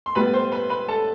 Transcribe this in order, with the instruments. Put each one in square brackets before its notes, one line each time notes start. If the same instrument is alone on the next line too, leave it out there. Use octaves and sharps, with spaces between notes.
[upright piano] C6
A2 G3 B3 B4 B5
C5 C6
B4 B5
B4 B5
A4 A5